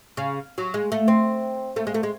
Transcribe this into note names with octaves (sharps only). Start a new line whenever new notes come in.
C#3
F#3
G#3
A3
C4
A3
G#3
A3
G#3